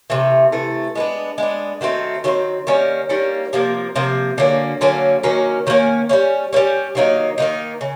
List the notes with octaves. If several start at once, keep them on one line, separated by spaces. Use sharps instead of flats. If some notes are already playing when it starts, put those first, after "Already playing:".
C3 E3 A3
C3 E3 A3
G#3 B3 D4
G#3 B3 D4
D#3 F#3 A3 C4
D#3 F#3 A3 C4
D#3 G3 A#3 C#4
D#3 G3 A#3 C#4
C3 F3 A#3
C3 F3 A#3
D3 F#3 A#3 C#4
D3 F#3 A#3 C#4
D#3 F#3 A#3 C#4
D#3 F#3 A#3 C#4
G3 A#3 C#4
G3 A#3 C#4
D#3 F#3 A#3 D#4
D#3 F#3 A#3 D#4
C#3